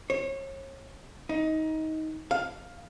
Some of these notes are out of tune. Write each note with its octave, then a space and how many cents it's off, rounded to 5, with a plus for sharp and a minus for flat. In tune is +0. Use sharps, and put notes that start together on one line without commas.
C#5 -35
D#4 +20
F5 +10